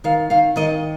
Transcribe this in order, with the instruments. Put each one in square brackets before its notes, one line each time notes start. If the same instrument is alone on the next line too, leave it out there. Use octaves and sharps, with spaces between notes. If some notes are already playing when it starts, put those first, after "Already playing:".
[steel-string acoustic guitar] D#3 F5
D#3 F5
D#3 D#5